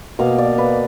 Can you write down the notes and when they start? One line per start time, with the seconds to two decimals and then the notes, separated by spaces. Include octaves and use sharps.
0.19 B2 A#3 F5
0.38 D5
0.58 B4